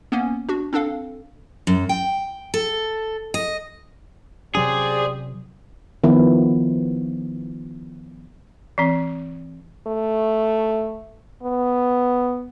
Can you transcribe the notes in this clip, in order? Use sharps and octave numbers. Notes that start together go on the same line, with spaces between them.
A#3 B3 C#4
D4 F#4
C4 D4 A4 F5
F#2
G5
A4
D#5
C3 F#3 C#4 G4 G#4 C5 D5
D#3 F3 B3 E4
E3 C4
A3
B3